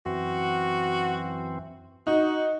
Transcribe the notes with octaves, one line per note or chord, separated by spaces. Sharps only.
F#2 E3 C4 F#4
D#4 F#4